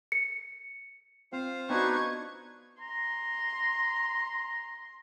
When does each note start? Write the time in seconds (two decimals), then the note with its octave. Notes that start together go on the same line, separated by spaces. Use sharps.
0.12 C#7
1.33 C4 F4 C5 F5
1.70 B3 D4 D#4 F#4 B4 C#6 G#6
2.81 A#5 C6